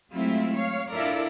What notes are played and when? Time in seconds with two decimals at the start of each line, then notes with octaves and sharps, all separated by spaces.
0.13 F#3 G#3 A3 C4 E4 F4
0.56 C#5 F5
0.91 D4 E4 F4 A4 A#4 D5